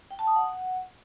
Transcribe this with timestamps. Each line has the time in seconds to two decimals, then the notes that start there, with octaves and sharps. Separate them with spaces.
0.11 G5
0.19 A5
0.27 D#6
0.36 F#5